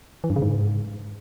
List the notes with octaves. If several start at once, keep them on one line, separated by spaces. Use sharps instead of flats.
E3
G2
C#3
G#2